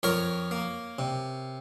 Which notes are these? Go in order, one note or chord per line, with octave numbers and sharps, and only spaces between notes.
F2 A#4 C#5
A#3
C3